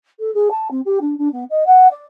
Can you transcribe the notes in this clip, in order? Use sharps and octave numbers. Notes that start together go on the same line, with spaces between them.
A4
G#4
A5
C4
G4
D4
D4
B3
D#5
F#5
D5